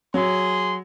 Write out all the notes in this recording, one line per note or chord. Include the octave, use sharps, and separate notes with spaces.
F#3 G#4 C6